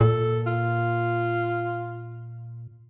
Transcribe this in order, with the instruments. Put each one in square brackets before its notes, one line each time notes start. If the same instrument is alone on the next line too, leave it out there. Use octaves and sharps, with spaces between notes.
[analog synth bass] A#2 [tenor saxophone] A4
[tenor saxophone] F4